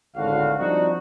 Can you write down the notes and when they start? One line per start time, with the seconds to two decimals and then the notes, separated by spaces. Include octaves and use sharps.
0.16 G#1 D2 A2 D3 F#4 F5
0.58 F3 G3 C4 D4 D#4 F#4